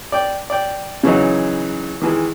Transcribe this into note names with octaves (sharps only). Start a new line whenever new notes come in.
D5 G5
D5 G5
C#3 E3 F#3 D#4
D#3 E3 G#3